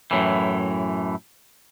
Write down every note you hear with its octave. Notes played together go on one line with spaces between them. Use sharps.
F#2 A2 E3